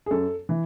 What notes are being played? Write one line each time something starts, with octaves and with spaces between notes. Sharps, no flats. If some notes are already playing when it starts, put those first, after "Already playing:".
G#4
F#2 A4
E3